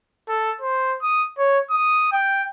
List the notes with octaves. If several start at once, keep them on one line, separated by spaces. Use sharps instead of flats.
A4
C5
D#6
C#5
D#6
G5